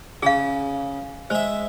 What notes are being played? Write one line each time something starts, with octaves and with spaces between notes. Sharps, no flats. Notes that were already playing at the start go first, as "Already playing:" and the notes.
C#3 G#4 F5
G#3 C5 E5